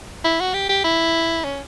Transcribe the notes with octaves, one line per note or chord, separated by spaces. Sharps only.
E4
F#4
G4
G4
E4
C#4